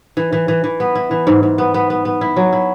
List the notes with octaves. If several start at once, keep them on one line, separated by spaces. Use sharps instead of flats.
E3
E3
E3
E3
B3
E4
E3
G#2
G#2
B3
B3
B3
B3
E4
F#3
E4